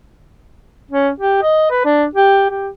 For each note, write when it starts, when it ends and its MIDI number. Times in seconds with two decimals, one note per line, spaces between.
0.91 1.09 61
1.20 1.41 67
1.43 1.71 75
1.71 1.85 71
1.85 2.05 62
2.15 2.48 67
2.50 2.69 67